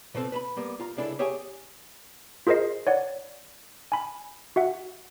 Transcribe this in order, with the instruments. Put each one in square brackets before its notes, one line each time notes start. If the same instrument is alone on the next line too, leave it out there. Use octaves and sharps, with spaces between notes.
[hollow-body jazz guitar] B2 F3 C4 A4
B4 A5 B5
G3 A#3 B3
F4 A#5
C#2 G#3 D4 E4 A4
G4 G#4 C#5 E5 G5 G#5
[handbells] F4 G#4 A#4 C5 D#5 C7
C#5 D5 F#5
G#5 B5
F#4 E5 F#5